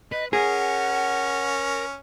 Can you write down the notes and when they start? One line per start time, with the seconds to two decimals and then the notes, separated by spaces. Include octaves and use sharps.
0.12 B4 D#5
0.33 C#4 G#4 A#4 F#5